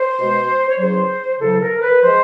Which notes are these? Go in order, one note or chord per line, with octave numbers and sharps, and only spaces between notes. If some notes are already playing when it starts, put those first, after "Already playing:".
Already playing: C5
B2 G#3
C#5
E2 C#3 F#3 C5
E2 C#3 F#3 A4
A#4
B4
F3 G#3 C5